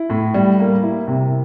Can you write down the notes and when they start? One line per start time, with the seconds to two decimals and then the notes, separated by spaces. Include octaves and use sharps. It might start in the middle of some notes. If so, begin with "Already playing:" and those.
Already playing: E4
0.10 A2
0.34 G3
0.59 A#3
0.83 E4
1.07 C3